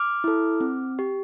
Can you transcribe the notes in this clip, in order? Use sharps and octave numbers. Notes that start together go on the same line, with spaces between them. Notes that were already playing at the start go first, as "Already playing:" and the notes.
Already playing: D6 F6
E4 A4
C4
G4